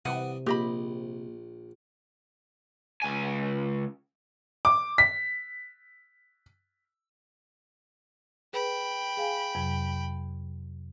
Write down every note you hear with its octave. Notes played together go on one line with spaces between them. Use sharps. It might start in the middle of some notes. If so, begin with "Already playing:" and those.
C3 E3 G3 B4 F#5 D#6
A#1 A#3 G4 D#5 B5
C#2 G#5
D6
B6
G#4 B4 G5 B5
G#4 F5 G#5
F2 C3 F#3